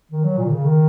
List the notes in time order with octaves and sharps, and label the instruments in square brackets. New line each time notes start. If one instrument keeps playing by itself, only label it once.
[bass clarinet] D#3
F#3
A#2
D#3
C#3
D#3